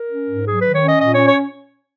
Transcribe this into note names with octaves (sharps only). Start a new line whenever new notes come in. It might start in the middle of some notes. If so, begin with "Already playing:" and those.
Already playing: A#4
C#4
G#2
F#3 G#4
D#3 B4
C#5
C#4 D#5
A#2 D#5
C#4 C#5
C#5